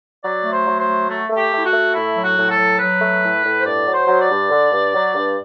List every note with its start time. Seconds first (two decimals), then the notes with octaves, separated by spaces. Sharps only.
0.23 F#3 D5
0.44 A3
0.52 C5
0.66 F#3
0.80 C5
0.87 A3
1.09 A3
1.30 A3
1.37 G4
1.51 A3
1.57 E4
1.66 F#4
1.73 A3
1.94 A2 E4
2.16 F#3
2.23 F#4
2.36 A2
2.51 A4
2.58 F#3
2.79 F#3 B4
3.00 A3
3.22 A2
3.43 A2
3.61 C5
3.65 G2 D5
3.86 F#3
3.93 C5
4.07 F#3
4.22 D5
4.29 G2
4.50 D3
4.72 G2
4.94 F#3
5.14 G2